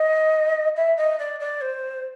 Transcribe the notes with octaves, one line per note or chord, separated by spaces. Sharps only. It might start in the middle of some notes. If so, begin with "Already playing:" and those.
Already playing: D#5
E5
D#5
D5
D5
C5